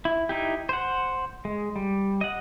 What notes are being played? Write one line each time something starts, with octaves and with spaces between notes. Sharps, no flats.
E4
D#4 E4 G4
C5 F#5
G#3
G3
D#5 F#5